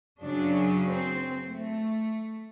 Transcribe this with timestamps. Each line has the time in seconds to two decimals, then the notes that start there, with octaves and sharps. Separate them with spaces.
0.21 F#2 C#3 F#3 D4
0.86 C4
1.49 A3